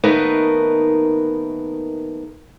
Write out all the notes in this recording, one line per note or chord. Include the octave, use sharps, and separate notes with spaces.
D#2 A3 B3 D#4 A#4 B4